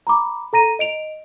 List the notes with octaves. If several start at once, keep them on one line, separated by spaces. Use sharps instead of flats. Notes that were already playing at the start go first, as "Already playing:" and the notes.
A#5 B5 D6
A4 A#5 A#6 D#7
D#5 D7 F7